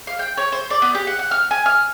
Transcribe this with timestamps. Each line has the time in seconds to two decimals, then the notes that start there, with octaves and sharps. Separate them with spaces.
0.07 F5
0.19 G5
0.37 C#5
0.52 C5
0.70 D5
0.82 B3
0.95 G4
1.07 F#5
1.19 F#5
1.31 F6
1.51 G#5
1.66 F6